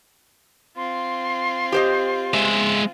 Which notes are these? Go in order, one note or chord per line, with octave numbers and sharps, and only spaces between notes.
C4 F4 C6
G4 C5 D#5
G#3 E5